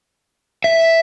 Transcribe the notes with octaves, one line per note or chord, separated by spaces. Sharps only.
E5